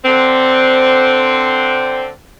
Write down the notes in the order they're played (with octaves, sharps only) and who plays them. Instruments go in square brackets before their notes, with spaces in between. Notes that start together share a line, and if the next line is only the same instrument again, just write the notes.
[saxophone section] D3 C4